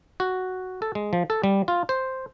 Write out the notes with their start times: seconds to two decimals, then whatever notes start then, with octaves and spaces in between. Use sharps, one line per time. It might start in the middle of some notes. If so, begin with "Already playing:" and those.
0.20 F#4
0.82 A4
0.95 G#3
1.13 F3
1.30 A4
1.44 G3
1.68 F4
1.89 C5